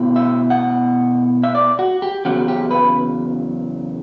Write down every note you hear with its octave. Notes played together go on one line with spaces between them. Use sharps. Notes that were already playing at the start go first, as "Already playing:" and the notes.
Already playing: B2 A3 E4
E5
F#5
E5
D5
F#4
G4
E2 C#3 F#3 F#4
G4
B4